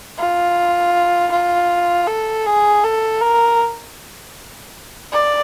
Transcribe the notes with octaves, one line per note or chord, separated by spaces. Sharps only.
F4
F4
A4
G#4
A4
A#4
D5